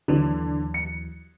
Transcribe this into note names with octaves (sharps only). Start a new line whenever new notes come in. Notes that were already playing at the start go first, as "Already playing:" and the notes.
D#2 D3 E3 F#3
C#7